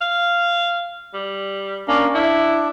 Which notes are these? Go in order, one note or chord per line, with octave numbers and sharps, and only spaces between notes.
F5
G3
A#3 C#4 D4
D4 E4